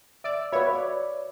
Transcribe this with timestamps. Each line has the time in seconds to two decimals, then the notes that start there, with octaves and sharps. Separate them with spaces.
0.24 D5 E5 E6
0.52 F#4 B4 C#5 E5 F5 B5
0.75 D5